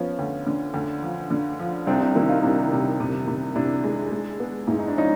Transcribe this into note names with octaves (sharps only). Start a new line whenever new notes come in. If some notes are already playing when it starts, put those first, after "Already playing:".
Already playing: F3 B3 C#4
D2
D3
D2
F3
D3
F3
C2 C4 D4
C4 D4
D#3 D4 E4
D#4 F4
C3 D4 E4
C3
C3
C3
C3 D4 E4
G#3
G#3
B3
G#2 E4
D#4
D4
F3 C#4 D#4